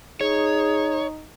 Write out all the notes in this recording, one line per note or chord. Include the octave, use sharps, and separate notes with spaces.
D#4 G#4 C#5